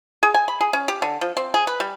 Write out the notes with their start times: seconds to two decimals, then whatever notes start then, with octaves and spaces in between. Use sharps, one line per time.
0.23 G#4
0.34 G#5
0.48 B5
0.61 G#4
0.73 C#4
0.88 G4
1.02 D3
1.21 F3
1.37 C4
1.54 G#4
1.67 B4
1.80 G3